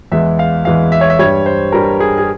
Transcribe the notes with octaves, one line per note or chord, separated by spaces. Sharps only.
E2 E3 G#3 E5
F5
E2 E3 G#3 F5
E5
C#5
E5
G2 G3 C#5
C5
G2 G3 A#4
G#4
G#4